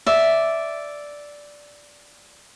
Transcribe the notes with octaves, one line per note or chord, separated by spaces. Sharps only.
D5 E5